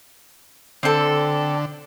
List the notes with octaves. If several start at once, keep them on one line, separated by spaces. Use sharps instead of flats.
D3 C4 A4